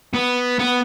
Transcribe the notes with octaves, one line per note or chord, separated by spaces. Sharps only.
B3
B3